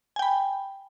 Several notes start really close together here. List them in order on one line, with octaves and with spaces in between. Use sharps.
G#5 G5 B5